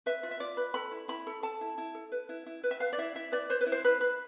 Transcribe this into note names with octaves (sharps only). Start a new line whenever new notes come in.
B4 E5
F4
E5
F4 D5
B4
A4 B5
E4
E4 B5
A4
A4 A5
E4
E4
A4
B4
E4
E4
B4
E5
B4 F5
D5
E4 E5
E4 E5
B4 D5
B4 C5
B4
E4
C5
E4 B4
B4